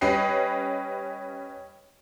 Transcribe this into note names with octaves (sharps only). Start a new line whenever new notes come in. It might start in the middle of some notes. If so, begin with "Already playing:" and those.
G3 C#4 B4 D#5 G5 C7